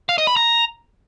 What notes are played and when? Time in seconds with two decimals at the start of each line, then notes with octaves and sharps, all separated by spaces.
0.09 F5
0.18 D#5
0.27 B5
0.36 A#5